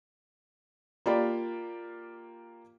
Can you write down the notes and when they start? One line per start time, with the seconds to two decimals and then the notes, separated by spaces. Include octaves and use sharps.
1.06 A#3 F4 G4 D5 G5 B5